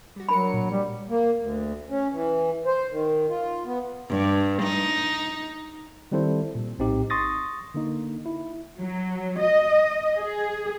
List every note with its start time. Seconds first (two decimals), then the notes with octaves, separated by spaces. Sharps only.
0.16 G3 F#4
0.29 F#3 D4 A#4 B5 C#7
0.54 A#2
0.71 G3
1.10 A#3
1.40 D2
1.90 C#4
2.12 E3
2.66 C5
2.91 D#3
3.29 F4
3.65 B3
4.09 G2
4.62 D#4
6.12 D#3 G3 C4 E4 A4 C5
6.55 A#2 G3
6.79 A#1 A2 C4 D#4 G4
7.10 C6 C#6 D#6 A6 A#6
7.74 D3 A#3 D#4
8.26 E4
8.79 F#3
9.40 D#5
10.19 G#4